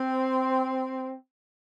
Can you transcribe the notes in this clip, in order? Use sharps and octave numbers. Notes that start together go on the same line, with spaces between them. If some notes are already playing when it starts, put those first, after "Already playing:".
Already playing: C4